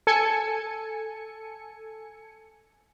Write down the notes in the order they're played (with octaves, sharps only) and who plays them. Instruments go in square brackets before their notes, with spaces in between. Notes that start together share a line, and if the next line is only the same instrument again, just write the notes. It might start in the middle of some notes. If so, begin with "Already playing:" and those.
[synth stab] A4 G#5 C#7